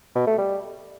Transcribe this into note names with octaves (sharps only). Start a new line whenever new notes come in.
B2
A3
G3